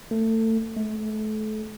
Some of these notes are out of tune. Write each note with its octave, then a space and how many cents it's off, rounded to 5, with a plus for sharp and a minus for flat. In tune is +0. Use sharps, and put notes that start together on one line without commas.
A3 +25
A3 -35